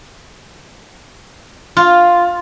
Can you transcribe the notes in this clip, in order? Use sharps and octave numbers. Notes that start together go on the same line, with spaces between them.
F4